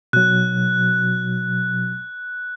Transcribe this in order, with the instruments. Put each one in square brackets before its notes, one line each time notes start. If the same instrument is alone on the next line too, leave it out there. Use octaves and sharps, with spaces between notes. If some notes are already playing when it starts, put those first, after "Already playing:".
[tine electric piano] B2 F#3 [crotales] F#6